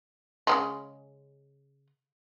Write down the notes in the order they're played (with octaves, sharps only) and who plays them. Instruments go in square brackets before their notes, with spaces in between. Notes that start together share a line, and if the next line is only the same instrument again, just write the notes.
[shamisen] C#3 F3 G#3